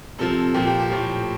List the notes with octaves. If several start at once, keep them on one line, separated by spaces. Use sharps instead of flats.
C3 F3 A4
A#2 F3 G4
G4
G4
A2 F3